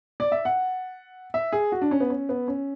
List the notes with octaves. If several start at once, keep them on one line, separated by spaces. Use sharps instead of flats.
D5
E5
F#5
E5
G#4
F#4
D4
C#4
B3
C#4
B3
C#4